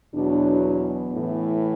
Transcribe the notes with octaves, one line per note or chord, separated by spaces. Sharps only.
E2 B2 F#3 D4
B3
A2 E3